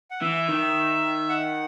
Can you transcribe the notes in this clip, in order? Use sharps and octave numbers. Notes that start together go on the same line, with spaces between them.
F#5
E3 E5
D#3
F#5